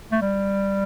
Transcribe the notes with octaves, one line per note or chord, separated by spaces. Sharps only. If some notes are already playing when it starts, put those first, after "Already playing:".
A3
G3